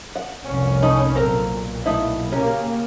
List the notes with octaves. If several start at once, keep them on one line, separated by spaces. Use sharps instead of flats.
F#5
F1 C2 C#4
A3 D#4 B5
B1 A#2 C4 A4 A#4
A3 D#4 E4
C#3 A#3 C#4 G4 A#4